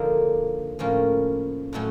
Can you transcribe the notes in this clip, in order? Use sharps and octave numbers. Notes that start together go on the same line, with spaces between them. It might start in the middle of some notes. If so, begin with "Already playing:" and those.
Already playing: D3 F3 A#3 D#4
A2 F3 A#3 C#4
A2 F#3 A3 C#4